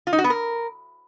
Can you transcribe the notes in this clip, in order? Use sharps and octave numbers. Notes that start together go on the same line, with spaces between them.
F4
D#4
F#4
B3
A#4